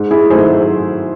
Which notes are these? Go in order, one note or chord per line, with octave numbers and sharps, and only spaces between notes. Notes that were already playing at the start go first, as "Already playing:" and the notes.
Already playing: G#2
E4 G#4
D#3 F#3 A3 G#4 C5